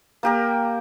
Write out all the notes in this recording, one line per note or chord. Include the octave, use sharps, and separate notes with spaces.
A#3 G4 A#4